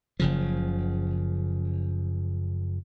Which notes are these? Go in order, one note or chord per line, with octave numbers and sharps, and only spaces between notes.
F#1 C#3 F3